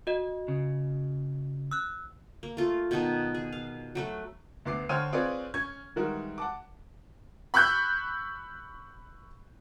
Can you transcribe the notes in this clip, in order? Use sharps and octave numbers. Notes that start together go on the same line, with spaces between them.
F#4 D#5
C#3
E6 F#6
A#3
A3 F4
B2 D#3 D#4 A5
G#4
F5
F#3 A3 B4
D2 B3 D6 C7
D3 C5 C#5 G5 F6 D#7
C4 F4 G#4 B4 C#5 D5
C#4 C#6 G#6
D#3 E3 G3 G#3 F#4 A#4
F#5 A5 D6
B5 C#6 E6 F#6 G6